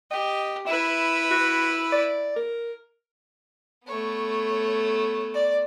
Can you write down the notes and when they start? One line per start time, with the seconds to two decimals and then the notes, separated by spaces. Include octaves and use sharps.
0.11 G4 D#5
0.67 E4 B4 E5
1.31 F#4
1.92 D5
2.36 A#4
3.86 A3 B3 C#5
5.34 D5